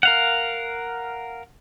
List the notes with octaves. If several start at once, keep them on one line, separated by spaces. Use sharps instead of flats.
A#4 F5 F#5